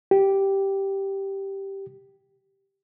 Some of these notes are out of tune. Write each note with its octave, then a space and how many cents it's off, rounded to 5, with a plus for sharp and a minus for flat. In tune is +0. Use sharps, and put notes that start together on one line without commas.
G4 -5